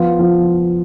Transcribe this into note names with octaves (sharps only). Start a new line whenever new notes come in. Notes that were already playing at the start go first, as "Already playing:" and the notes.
Already playing: F3 B3 F4
F3 B3 F4